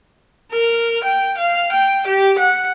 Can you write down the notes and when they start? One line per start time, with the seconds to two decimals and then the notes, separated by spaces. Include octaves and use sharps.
0.52 A#4
1.04 G5
1.37 F5
1.72 G5
2.07 G4
2.38 F#5